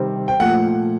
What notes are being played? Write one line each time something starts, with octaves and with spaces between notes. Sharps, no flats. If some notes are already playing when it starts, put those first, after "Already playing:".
Already playing: C3 D#3 G3 C4
G5
A#2 F3 A3 F#5